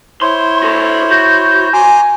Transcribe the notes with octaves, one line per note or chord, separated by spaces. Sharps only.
E4 C5 C#5 C6
F#4 A4
F#4 G6
G#5 A#5 C6 D6